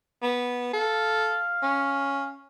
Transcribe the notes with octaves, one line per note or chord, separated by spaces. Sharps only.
B3
A4 F5
C#4